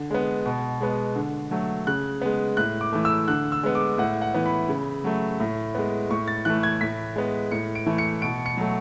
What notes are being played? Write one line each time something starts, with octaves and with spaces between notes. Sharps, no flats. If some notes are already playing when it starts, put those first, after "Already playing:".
Already playing: D3
G#3 B3
B2
G#3 B3
D3
F#3 A3
C#3 F#6
G#3 B3
A2 F#6
D6
E3 A3
E6
D3 F#6
E6
G#3 B3
D6
A2 F#5
F#5
E3 B3
B5
C#3
F#3 A3
A2
G#3 B3
A2 C#6
A6
E3 A3 F#6
G#6
A2 B6
G#3 B3
A2 C#7
D7
E3 A3
C#7
B2 D7
C#7
F#3 A3